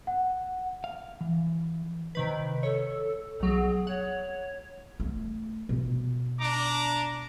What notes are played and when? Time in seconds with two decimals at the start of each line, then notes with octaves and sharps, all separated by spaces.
0.07 F#5
0.84 F5
1.21 E3
2.15 C3 D#3 B4
2.63 A4 C#5
3.40 B1 F#3 G#4
3.87 C#5 F#5
5.00 A3
5.69 B2 B3
6.40 D4 A#5 D6